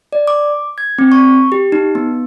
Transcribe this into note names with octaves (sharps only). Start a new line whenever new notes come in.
D5
D6
G#6
C4
C#6
G4
D#4
B3